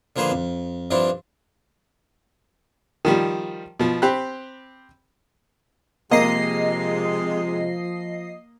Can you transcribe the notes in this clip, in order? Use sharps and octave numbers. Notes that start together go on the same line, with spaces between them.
D3 F3 A#3 G#4 B4 C5
F2
G2 F3 C4 D4 E4
D#3 F3 G3
B2 F3
C4 G4 B5 F#6
C3 F3 G#3 A#3 D#5 C7